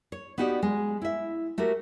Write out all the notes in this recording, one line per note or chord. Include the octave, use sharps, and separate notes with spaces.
C#5
B3 D#4 F#4 G4 D5
G#3
E4 E5
A3 F#4 G4 A#4